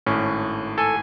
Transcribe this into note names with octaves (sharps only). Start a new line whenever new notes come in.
G#1 A2 C#4
A4 G#5